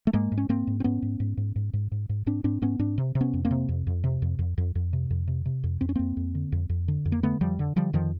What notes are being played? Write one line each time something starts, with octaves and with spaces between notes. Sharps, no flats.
A3
G#2 G#3 A#3
G#2
C#4
G#2 A#3 C4
G#2
C4
G#2 B3 C#4
G#2
G#2
G#2
G#2
G#2
G#2
G#2
G#2 C4 D4
G#2 C4 D4
G#2 B3 C#4
G#2 C4 D4
C3
C3
B3 C#4
F2
A#3 C4
C3
F2
F2
C3
F2
F2
F2
F2
C3
F2
C3
C3
F2
F2 C4
C#4
F2 A#3 C4
F2
D3
F2
F2
D3
F2
A#3
D3 A3 B3
F2 F3 G3
D3
D3 F3 G3
F2 D#3 F3